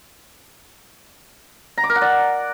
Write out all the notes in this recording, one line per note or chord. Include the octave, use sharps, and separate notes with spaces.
A#5
D6
A#4
F#5
D5